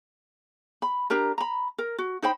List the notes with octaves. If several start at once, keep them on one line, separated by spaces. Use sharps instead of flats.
B5
D4 G4 A#4 A#5
A#5 B5
A#4
F#4
D#4 C5 G5 B5